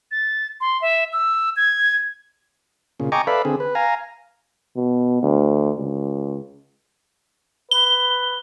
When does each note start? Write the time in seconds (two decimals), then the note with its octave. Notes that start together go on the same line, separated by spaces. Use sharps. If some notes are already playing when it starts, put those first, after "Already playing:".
0.11 A6
0.61 C6
0.82 E5
1.13 E6
1.57 G#6
3.00 A#2 C#3
3.12 D#5 G5 G#5 A#5 C#6 D6
3.27 A4 B4 D5 E5 F5 B5
3.45 D3 C4 G#4
3.60 B4
3.75 F5 G#5 A#5
4.76 B2
5.22 D2
5.77 C#2
7.71 B4 G7